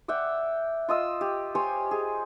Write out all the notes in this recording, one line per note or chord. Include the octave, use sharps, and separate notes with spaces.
D5 E5 F#5 G5
F4 D#5 E6
G4
G4 C5 C#5 G#5
G#4